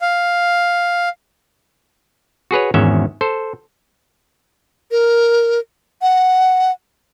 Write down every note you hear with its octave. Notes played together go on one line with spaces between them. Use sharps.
F5
F#4 G#4 B4 C#5
G#1 E2 G#2 C#4 E5
A4 C5
A#4
F#5